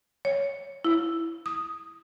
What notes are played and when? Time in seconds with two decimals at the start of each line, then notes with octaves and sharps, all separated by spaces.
0.25 C#5
0.84 E4
1.46 D#6